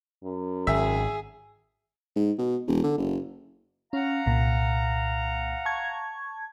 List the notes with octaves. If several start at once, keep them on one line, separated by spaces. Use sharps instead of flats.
F#2
G#1 G#4 E5
G#2
B2
E1
D3
F#1
C#4 F5 F#5 A#5
C2 A#2
A5 C#6 G#6